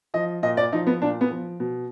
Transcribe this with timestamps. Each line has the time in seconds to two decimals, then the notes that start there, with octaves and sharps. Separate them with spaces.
0.14 F3 D#5
0.43 A#2 D#5
0.57 D5
0.72 F3 D#4
0.87 B3
1.02 A#2 D4
1.21 B3
1.31 F3
1.60 B2